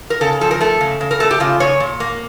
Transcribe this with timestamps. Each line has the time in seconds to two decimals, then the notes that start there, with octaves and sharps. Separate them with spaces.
0.10 A#4
0.21 C#3 A4
0.41 F3 A4
0.51 A#4
0.61 A3 A4
0.81 C#3
1.01 C#3
1.11 A#4
1.20 A3 A4
1.31 G4
1.40 C#3 F4
1.60 C#3 C#5
1.80 A#2
2.00 A#3